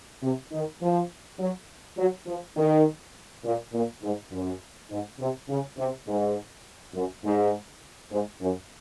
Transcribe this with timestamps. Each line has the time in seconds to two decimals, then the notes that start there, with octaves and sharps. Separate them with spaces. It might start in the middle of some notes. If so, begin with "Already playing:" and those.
0.22 C3
0.52 D#3
0.81 F3
1.39 F#3
1.97 F#3
2.27 F3
2.56 D#3
3.44 A#2
3.73 A#2
4.02 G#2
4.32 F#2
4.90 G#2
5.19 C3
5.49 C#3
5.77 C3
6.07 G#2
6.94 F#2
7.24 G#2
8.11 G#2
8.41 F#2